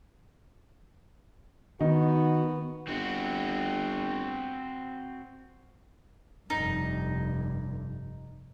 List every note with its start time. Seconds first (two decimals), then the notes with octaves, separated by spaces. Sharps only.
1.81 D#3 B3 D#4 F#4
2.88 G1 C4 F#4
6.50 F1 G2 D#4